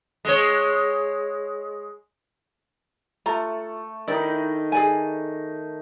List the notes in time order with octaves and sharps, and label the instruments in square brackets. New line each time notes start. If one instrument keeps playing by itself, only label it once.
[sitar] G#3 C#5
[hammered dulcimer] A3 [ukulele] F4 A#5
[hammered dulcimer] D#3 D#4 [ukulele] E4 D5
[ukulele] G#4 D5 G#5